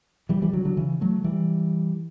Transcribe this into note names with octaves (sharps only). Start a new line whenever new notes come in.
E3 G3
E3 G3
D3 F#3
D3 F#3
C#3 E3
F#3 A3
E3 G3